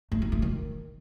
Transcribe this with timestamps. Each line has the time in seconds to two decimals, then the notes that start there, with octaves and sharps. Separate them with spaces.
0.12 A3
0.22 D#4
0.32 A3
0.42 D#3